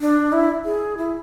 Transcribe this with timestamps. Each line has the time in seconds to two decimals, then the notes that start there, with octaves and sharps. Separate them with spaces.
0.01 D4
0.32 E4
0.65 G#4
0.98 E4